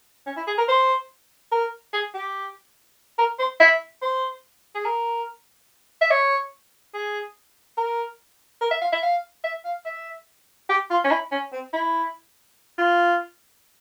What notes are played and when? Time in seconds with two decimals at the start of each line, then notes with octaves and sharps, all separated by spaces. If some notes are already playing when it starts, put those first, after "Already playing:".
0.26 C#4
0.37 E4
0.47 G#4
0.58 A#4
0.68 C5
1.52 A#4
1.93 G#4
2.14 G4
3.18 A#4
3.39 C5
3.60 E5
4.02 C5
4.75 G#4
4.85 A#4
6.01 E5
6.10 C#5
6.94 G#4
7.77 A#4
8.61 A#4
8.71 E5
8.81 F5
8.92 E5
9.03 F5
9.44 E5
9.65 F5
9.85 E5
10.69 G4
10.90 F4
11.04 C#4
11.11 E4
11.32 C#4
11.53 C4
11.73 E4
12.78 F4